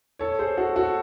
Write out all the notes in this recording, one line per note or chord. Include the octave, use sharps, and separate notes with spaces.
A4 C#5
C#5
G#4 C5
F#4 A4
F#4 A4